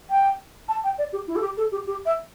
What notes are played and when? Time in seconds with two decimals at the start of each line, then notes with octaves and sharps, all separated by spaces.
0.10 G5
0.68 A5
0.84 G5
0.98 D5
1.12 G4
1.27 E4
1.36 A4
1.41 G4
1.57 A4
1.72 G4
1.87 G4
2.05 E5